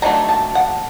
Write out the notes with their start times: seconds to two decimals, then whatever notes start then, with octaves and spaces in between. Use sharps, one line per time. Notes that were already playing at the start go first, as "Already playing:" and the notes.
0.02 D#3 F#3 A3 D4 A#5
0.29 A5
0.55 F#5